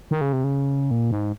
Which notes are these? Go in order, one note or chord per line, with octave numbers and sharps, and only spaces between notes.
D#3
C#3
C3
C#3
A#2
G#2